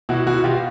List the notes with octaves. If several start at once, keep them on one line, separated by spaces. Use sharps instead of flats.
B2 E4 F#4
B2 E4 F#4
B2 F4 G4